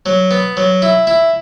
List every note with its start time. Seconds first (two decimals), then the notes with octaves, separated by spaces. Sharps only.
0.06 F#3
0.31 B3
0.57 F#3
0.82 E4
1.07 E4